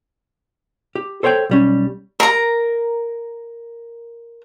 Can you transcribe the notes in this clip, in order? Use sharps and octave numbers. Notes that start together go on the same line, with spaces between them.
G4
A4 C5 C#5 F#5 G5
B1 G3 C#4
A#4 A#5